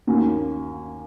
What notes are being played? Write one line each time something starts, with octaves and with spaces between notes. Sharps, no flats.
D#2 D#3 A#3 C#4 F#4